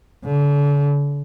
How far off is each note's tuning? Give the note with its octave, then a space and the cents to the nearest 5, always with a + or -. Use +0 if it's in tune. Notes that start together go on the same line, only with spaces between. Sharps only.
D3 -40